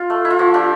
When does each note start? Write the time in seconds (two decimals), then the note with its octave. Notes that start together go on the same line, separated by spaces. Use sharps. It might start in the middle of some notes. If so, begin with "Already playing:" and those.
Already playing: F4
0.10 A3
0.25 E4
0.30 F4
0.39 F3 F#4
0.54 D4 F4 G4